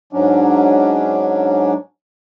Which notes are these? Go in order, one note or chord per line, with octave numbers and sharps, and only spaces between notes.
G#2 F#3 C#4 D4